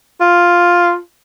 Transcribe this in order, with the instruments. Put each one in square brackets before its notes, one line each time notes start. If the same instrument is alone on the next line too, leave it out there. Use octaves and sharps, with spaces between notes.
[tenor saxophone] F4